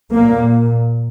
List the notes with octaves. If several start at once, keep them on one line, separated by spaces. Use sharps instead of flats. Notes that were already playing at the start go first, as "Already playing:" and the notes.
A#2 A#3